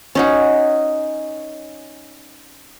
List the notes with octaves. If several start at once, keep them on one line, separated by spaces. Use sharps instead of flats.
C#4 D#4 F#4